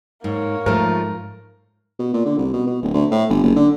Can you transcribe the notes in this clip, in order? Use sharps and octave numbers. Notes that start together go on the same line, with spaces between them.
G#2 A#3 C#5
G#2 F3 A3 A#4
B2
A#2
D3
C2
B2
B2
D1
D2
A2
G1
F#1
D3